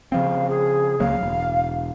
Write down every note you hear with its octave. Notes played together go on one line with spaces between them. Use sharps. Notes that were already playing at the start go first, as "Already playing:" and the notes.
C#3 F3 C4 F5
G#4
C#2 F#3 A#3 F5
E1